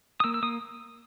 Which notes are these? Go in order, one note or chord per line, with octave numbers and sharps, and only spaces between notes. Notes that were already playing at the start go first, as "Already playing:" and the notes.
D#6
A#3 E6
E6
A#3 D#6